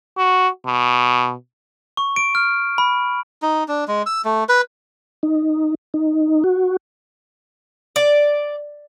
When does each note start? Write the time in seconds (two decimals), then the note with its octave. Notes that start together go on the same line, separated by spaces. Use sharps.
0.17 F#4
0.67 B2
1.97 C#6
2.16 D7
2.35 F6
2.78 B5
3.42 D#4
3.68 D4
3.88 G#3
4.06 E6
4.25 A3
4.49 B4
5.23 D#4
5.94 D#4
6.44 F#4
7.96 D5